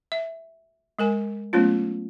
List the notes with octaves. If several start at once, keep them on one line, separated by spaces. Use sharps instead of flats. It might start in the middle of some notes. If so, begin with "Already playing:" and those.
E5
G#3 A#4 G#5
F#3 A3 B3 C#4 F4